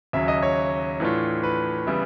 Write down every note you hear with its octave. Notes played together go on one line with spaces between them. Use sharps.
D#2 C#3 F#3 E5
D#5
C#5
A2 E3 A3 D4 F4
B4
C#3 E3 G3 B3 E4